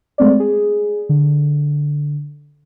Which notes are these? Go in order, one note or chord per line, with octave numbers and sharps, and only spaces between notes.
G#3 A3 C4 D5
G#4
D3